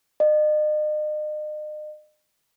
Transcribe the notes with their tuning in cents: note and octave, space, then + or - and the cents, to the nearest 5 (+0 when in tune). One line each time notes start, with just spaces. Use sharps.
D#5 -40